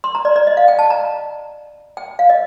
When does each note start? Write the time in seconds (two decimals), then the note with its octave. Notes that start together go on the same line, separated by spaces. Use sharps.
0.04 C6
0.15 A#5
0.25 D5
0.36 D5
0.47 D#5
0.57 F5
0.68 G5
0.79 A5
0.90 A#5
1.97 G5
2.19 F5
2.30 D#5